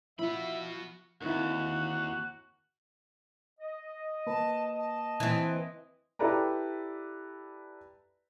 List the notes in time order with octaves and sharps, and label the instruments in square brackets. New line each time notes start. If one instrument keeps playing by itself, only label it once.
[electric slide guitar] F3 [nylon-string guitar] E4 [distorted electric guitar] F#4 B5 [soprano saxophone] E5
[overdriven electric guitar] D#2 [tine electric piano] D#3 C4 E4 [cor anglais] F#4
[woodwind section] D#5
[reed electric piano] A#3 A#4 B4 [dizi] A5
[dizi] A5
[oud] E3 C4
[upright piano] E4 G4 A4 B4 D5 A#5